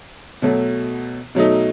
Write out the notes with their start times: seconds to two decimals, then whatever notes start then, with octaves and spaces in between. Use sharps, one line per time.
0.42 B2 F#3 A3
1.35 B2 F#3 A3 D#4